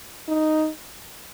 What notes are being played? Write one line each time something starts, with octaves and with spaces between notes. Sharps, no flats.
D#4